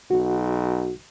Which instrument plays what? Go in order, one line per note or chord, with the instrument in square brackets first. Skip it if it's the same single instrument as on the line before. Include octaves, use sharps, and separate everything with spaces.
[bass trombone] B1 [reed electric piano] F#4